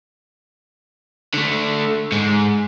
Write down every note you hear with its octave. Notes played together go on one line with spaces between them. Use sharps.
D3 A3
G#2 G#3